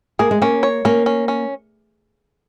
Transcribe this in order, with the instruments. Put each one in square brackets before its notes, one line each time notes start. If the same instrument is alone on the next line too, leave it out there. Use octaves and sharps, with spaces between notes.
[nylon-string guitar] A#3 [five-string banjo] G#4
[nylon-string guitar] G#3
[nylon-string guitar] A#3 [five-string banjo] C#4
[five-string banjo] C#5
[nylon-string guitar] A#3 [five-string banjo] C#4
[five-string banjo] C#4
C#4